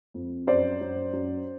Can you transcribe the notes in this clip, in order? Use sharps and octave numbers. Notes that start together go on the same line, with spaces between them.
F2
F#2 C5 D5
F#2
F#2